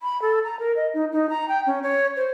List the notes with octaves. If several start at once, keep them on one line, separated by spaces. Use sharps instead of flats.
B5
A4
A#5
A#4
D#5
D#4
D#4
A#5
G5
C#4
C#5
C5